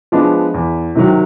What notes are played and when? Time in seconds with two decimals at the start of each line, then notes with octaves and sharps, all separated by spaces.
0.12 F3 G#3 B3 D4
0.54 E2
0.95 C3 D#3 F#3